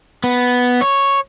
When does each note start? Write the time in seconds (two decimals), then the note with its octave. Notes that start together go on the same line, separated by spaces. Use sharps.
0.24 B3
0.81 C#5